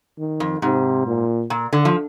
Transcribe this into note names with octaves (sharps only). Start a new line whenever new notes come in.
D#3
F2
G#2 C3
A#2
A#2
D3
F3